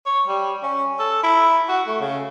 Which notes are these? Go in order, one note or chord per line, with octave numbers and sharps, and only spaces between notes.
C#5
G3
C#4
A4
E4
F#4
A3
C#3